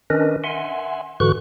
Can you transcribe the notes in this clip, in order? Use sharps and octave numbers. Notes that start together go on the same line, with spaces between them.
D#3 C#4 D4 A#4 B4 D#5
E5 F#5 G#5 C6
G#2 D3 E3 F#4 C#6 F#6